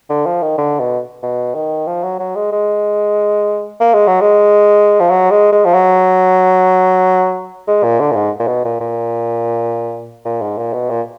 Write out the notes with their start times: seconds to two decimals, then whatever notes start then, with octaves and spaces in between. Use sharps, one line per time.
0.10 D3
0.26 F3
0.42 D#3
0.58 D3
0.80 B2
1.23 B2
1.55 D#3
1.87 F3
2.03 F#3
2.19 F#3
2.36 G#3
2.52 G#3
3.80 A#3
3.94 G#3
4.07 F#3
4.21 G#3
5.00 F3
5.10 F#3
5.31 G#3
5.52 G#3
5.65 F3
5.74 F#3
7.68 G#3
7.83 A#2
8.00 D3
8.11 A#2
8.16 G#2
8.39 A#2
8.47 B2
8.65 A#2
8.80 A#2
10.25 A#2
10.41 G#2
10.58 A#2
10.73 B2
10.90 A#2